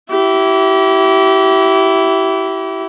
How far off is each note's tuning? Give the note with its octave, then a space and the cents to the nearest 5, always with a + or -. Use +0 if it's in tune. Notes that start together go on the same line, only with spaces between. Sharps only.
E4 +0 G4 -35